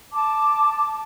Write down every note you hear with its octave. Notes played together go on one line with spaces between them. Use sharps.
A5 D6